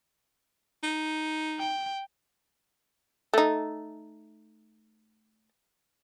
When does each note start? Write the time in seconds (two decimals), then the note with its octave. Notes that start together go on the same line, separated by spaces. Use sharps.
0.83 D#4
1.59 G5
3.34 A3 D#4